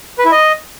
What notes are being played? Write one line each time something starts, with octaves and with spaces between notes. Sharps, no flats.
B4
E4
D#5